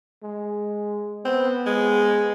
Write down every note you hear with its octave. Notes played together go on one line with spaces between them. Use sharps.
G#3
B3 C4
G#3